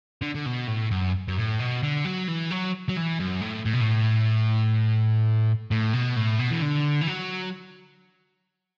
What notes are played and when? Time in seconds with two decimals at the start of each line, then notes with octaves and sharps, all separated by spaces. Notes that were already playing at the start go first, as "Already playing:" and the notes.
0.22 D3
0.35 D3
0.46 B2
0.68 A2
0.91 F#2
1.28 F#2
1.37 A2
1.59 B2
1.83 D3
2.05 F#3
2.28 E3
2.51 F#3
2.89 F#3
2.97 E3
3.20 F#2
3.42 A2
3.65 A2
3.73 B2
3.81 A2
5.71 A2
5.93 B2
6.17 A2
6.39 B2
6.51 E3
6.62 D3
7.01 E3
7.07 F#3